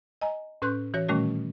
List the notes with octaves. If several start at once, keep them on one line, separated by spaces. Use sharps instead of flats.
D#5 G#5 A#5
A2 C#4 B4 C6 F#6 G6
E3 F#4 C#5 A#6
A#2 D#3 G3 A3 C#4 F#4